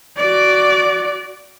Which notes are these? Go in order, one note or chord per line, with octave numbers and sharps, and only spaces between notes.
F#4 D5